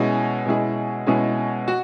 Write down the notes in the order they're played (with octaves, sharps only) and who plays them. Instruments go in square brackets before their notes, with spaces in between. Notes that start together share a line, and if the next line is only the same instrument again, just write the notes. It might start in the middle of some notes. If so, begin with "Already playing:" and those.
Already playing: [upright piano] B2 G#3 C#4 E4 G#4
B2 G#3 C#4 E4 G#4
B2 G#3 C#4 E4 G#4
F#4